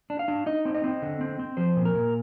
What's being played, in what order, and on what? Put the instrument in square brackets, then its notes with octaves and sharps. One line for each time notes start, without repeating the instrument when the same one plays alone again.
[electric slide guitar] D4
F5
D4
D#4 D#5
C4
D#5
C4
D3
C4
C4
F3 C5
A#2
A#4
A#2